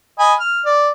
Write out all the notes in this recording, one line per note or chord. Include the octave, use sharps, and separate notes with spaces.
D#5 G#5 B5
F6
D5